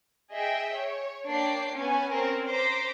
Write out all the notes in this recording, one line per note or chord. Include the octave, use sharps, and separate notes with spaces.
G#4 D#5 E5 G5
C#5
A#3 D4 C#5 G5 D6 C7
B3 C#4 G#5
C4 C#4 A#4 C#5
C5 A#5 D6 B6 D7